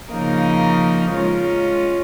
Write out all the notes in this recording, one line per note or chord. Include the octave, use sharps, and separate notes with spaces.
C#3 F3 A#3 D#4 A#4
G#3 C#4 F4